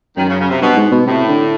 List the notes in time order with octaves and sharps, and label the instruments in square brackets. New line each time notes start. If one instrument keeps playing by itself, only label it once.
[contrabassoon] F#2 [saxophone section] D#3
[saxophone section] C#3
C#3
C3
[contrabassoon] G2 [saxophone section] B2
[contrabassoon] G#2
B2
[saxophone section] A2 [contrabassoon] C3
[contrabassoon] D3